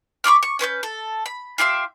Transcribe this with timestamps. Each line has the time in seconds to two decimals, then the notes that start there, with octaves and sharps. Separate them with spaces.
0.24 B5 C#6 D6 F6
0.43 C#6
0.59 C#4 B4 C#6 G6
0.83 A4
1.26 B5
1.58 F4 G4 E5 C6